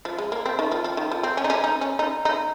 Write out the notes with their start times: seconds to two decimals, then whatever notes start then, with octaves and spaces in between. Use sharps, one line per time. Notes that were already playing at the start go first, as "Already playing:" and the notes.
0.05 F3
0.18 G#3
0.32 A#3
0.46 C4
0.59 D#3
0.71 F3
0.84 F3
0.97 D#3
1.11 F3
1.23 C4
1.37 C#4
1.44 D#4
1.50 C#4
1.64 D#4
1.81 C#4
1.99 D#4
2.25 D#4